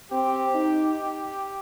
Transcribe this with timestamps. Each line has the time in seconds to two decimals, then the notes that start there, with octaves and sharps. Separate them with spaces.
0.12 C4 G4
0.54 D#4